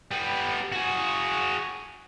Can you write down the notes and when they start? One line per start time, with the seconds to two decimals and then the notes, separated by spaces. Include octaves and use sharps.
0.11 G3 B3
0.72 F#4 G#4